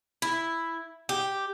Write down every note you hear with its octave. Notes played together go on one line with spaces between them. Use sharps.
E4
G4